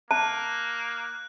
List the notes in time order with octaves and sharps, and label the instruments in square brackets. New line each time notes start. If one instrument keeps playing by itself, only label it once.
[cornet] A#3 [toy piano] A5 [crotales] F#6